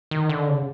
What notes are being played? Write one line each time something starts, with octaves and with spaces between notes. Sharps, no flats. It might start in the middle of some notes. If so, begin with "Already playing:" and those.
D#3
D3
C#3